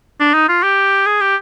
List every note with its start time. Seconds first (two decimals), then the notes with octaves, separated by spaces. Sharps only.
0.20 D4
0.34 D#4
0.49 F4
0.63 G4
1.06 G#4
1.21 G4